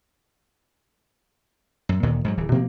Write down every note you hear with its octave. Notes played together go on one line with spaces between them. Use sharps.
F#2
D2 A#2 D#3
G#2 F3 F#3
D1 E3
B2 F3 A#3 C4